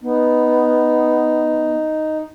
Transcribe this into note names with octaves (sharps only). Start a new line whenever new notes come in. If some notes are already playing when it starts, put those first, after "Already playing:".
B3 D#4